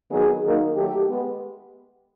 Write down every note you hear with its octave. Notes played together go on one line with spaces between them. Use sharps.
D#3 F#3 B3 G#4
D#3 F#3 A#3 D#4
D#3 F#3 A3 G4
G#3 B3